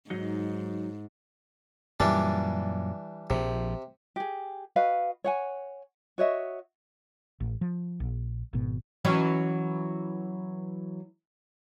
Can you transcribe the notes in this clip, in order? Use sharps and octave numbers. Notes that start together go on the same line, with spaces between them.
G#2 F#3 D#4 F#5
F#2 A#2 E3 G3 D4
A#1 C3 F3
G4 G#4
F#4 B4 D#5 F5
C#5 F#5 G#5
F#4 C#5 D#5 E5
A1
F3
A#1
G#1 B2
E3 F#3 C#4